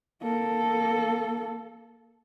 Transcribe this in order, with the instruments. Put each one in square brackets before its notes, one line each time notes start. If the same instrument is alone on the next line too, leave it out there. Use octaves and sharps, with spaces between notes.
[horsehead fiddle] A#3 A4